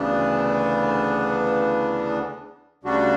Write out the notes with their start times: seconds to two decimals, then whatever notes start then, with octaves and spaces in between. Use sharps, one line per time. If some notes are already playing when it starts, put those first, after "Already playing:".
Already playing: D2 C#3 E3 B3 D4
2.83 D2 C#3 G3 D4 F#4